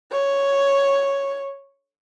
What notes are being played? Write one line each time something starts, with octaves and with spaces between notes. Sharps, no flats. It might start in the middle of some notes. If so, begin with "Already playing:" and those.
C#5